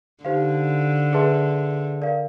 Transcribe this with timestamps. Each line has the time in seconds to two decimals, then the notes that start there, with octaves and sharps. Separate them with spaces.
0.24 D3 D#4 G4 C5 F5
1.13 G#4 B4 E5 A5 C6
2.01 A#4 D5 F5